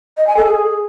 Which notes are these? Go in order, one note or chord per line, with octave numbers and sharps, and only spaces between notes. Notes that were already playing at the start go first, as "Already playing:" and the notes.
D#5
G#5
A4
G#4